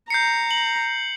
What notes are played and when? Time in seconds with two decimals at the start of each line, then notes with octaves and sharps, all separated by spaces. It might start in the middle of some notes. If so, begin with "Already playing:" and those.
0.10 A#5 G6 C7 C#7
0.51 F#7